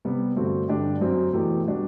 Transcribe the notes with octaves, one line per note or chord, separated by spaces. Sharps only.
C3 G3 B3
G2 D3 A3 C4 F#4
G2 D3 G3 D4 G4
F#2 F#3 C4
E2 B2 A3 E4 G4
B2 G3 D4 F#4